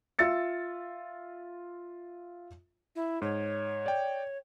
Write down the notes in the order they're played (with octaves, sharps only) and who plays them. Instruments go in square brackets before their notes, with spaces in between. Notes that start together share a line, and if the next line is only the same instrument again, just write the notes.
[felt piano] F4 E5 E6 A6 C#7
[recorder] E4
[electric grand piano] G#2 [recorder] C#5
[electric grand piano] D5 G5